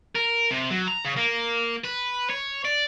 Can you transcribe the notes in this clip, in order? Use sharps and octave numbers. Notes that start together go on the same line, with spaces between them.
A#4
C3
F#3
A#5
C#3
A#3
B4
C#5
D5